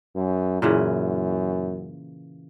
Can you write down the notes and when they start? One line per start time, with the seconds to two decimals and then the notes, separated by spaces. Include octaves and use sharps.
0.15 F#2
0.62 F#2 A#2 C#3 E3